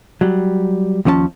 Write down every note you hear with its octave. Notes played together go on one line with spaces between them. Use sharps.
F#3 G3
D#2 F3 C#4 D5 A5